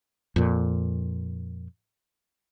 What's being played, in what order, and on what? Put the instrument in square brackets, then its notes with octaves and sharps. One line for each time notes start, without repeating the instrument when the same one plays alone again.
[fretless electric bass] F2 A#2